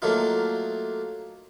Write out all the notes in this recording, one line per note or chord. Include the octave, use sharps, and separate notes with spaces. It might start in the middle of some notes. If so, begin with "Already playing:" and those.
F#3 A3 A#3 D#4 F4